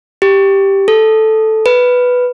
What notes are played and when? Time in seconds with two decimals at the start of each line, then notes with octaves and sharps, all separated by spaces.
0.22 G4
0.88 A4
1.66 B4